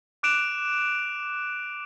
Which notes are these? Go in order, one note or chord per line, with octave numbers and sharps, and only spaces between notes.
D6 F#6 D7 E7 F7